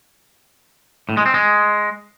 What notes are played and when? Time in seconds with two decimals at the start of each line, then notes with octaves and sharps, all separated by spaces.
1.09 A2
1.17 G#3
1.26 C4
1.34 G#3